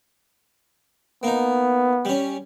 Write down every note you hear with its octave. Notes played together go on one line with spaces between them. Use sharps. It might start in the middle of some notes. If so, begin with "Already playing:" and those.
A#3 B3 D#4
G3 C#4